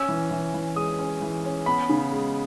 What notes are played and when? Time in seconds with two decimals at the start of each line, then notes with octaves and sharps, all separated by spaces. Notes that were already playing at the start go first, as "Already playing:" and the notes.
Already playing: C#4 E6
0.08 E3
0.31 E3
0.54 E3
0.76 G#3 D#6
0.99 C#4
1.22 E3
1.44 C#4
1.66 B3 B5
1.89 C#3
2.12 G#3